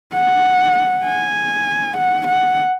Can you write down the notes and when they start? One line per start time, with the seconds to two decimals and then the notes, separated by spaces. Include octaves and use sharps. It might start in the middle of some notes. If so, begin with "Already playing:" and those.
0.14 F#5
1.05 G#5
1.97 F#5
2.28 F#5